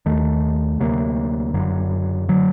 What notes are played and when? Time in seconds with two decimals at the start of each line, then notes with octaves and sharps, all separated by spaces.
0.06 D#2 D#3 A3
0.79 D2 C3 F#3 A#3
1.54 F#1 F#2 D3 F#3
2.29 D3 F#3